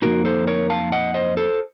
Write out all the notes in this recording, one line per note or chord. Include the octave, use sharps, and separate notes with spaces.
F2 D#3 A#3 D#4 F#4 A#4
A4 C5
A#4 C#5
F5 A5
D#5 F#5
C5 D#5
A4 C5